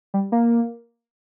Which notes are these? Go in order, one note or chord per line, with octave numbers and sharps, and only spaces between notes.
G3
A#3